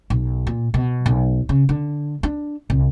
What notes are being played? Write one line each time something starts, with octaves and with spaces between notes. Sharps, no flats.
B1
A#2
B2
B1
C#3
D3
D4
C2